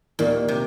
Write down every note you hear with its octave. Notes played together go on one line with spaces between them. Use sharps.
D#2 A#2 D#3 A#3 D#4
C3